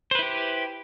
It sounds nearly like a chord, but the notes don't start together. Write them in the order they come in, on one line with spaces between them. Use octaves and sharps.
C5 B4 E4 G4